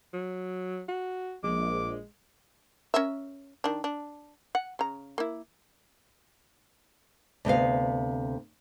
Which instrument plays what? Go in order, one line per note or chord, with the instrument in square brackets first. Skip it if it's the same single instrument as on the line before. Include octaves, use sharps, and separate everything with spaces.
[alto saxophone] F#3
F#4
[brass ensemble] A#1 [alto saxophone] G#3 [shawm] D6
[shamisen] C#4 A#4 E5
D#3 D4
D4
F#5
C#3 A#5
A#3 E4
[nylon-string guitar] D2 C3 B3 F5